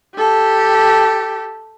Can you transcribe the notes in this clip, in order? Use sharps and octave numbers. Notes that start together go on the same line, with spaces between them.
G4 A4